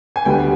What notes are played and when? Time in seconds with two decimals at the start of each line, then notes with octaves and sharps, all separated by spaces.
0.16 G#5
0.25 D2 D3 G3 B3 G5